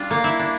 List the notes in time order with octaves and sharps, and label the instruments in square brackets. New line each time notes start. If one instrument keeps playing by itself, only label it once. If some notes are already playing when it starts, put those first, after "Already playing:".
Already playing: [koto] G3 D4 F4
A#3
E4
D4